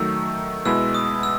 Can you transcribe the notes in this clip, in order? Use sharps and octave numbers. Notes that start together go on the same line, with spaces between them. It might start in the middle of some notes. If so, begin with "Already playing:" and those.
Already playing: D#3 F#3 A3 E6
B2 G#3 B3 E4 E6
D#6
E6